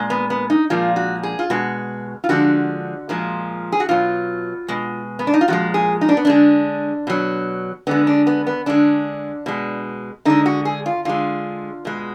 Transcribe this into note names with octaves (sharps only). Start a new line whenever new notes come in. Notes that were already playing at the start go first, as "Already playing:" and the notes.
Already playing: A#2 G#3
B3
B3
D#4
A#2 F3 G#3 F4
F#4
G#4
F4
B2 G#3 F#4
F4
D3 F3 G#3 F#4
A#2 F3 G#3
G#4
F#4
B2 F#3 F4
B2 G#3
B3
D4
D#4
F4
A#2 F3 G#3 F#4
G#4
D#4
D4
B3
D3 G#3 D4
B2 F#3
D3 G#3 B3
D4
B3
B3
D3 G#3 D4
B2 G#3
D3 G#3 D#4
F#4
G#4
F4
D3 G#3 F4
B2 G#3